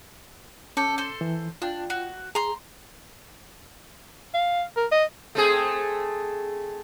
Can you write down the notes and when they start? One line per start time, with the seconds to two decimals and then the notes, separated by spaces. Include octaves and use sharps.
0.77 C#4 A4 D6 G6
0.98 A4 C5
1.21 E3
1.62 D4 F4 G5
1.90 F#4
2.35 G#4 A#5 C6
4.34 F5
4.76 A#4
4.92 D#5
5.35 A3 C4 G#4